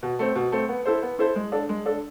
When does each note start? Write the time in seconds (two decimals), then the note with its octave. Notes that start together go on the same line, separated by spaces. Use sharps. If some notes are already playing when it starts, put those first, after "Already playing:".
0.03 B2
0.19 A3 C4
0.35 B2
0.52 A3 C4
0.69 B3
0.86 E4 A4 C5
1.03 B3
1.19 E4 A4 C5
1.36 G#3
1.52 D4 A4
1.69 G#3
1.86 D4 A4